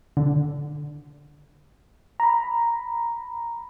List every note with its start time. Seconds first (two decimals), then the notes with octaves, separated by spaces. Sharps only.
0.17 D3
2.20 A#5 B5